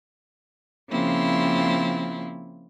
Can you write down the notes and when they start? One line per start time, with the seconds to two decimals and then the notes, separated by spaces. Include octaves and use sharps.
0.89 C#3 F3 A#3 C4 E4 F4